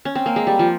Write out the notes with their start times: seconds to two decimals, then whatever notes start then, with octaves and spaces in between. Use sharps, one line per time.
0.05 C#4
0.15 C4
0.26 A#3
0.36 G#3
0.47 G3
0.59 F3